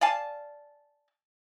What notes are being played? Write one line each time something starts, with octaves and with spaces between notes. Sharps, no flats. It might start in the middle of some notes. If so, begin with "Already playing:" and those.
D5 F5 G#5 A5